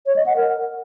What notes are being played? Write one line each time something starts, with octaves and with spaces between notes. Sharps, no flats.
C#5
D#5
F#5
A#4